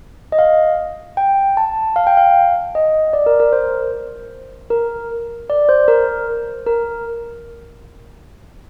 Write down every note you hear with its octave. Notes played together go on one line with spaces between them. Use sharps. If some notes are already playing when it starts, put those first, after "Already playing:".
D#5
F5
G5
A5
F5
G5
F5
D#5
D5
A#4
A#4
C5
A#4
D5
C5
A#4
A#4